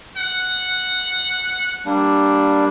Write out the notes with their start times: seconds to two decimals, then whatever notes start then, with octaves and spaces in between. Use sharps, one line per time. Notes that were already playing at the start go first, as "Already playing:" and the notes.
0.17 F#5
1.86 G3 A#3 D4